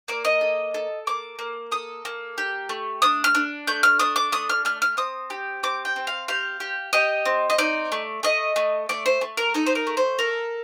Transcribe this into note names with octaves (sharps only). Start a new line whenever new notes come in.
A#3 D5
D#5
A4
A4
A#3 D6
A#3
A4 D#6
A#3
G4
A3
D4 D#6
F6
D4
A3 G6
F6
D4 D#6
D6
A3 D#6
F6
A3 F6
F6
C4 D#6
G4
C4 D6
G5
C4
F5
G4 F5
G4
G4 D#5
C4
D#5
D#4 D5
A3
A3 D#5
A3
A3 D5
C5
A3
A#4
D#4 A4
C5
A#4
A3
C5
A4 A#4